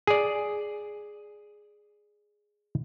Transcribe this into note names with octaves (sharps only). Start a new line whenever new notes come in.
G#4 D5